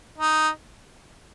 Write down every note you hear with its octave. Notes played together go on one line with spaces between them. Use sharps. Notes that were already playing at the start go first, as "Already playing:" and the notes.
D#4